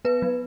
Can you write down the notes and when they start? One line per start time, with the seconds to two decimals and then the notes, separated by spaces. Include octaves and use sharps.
0.05 B3 B4
0.22 F#3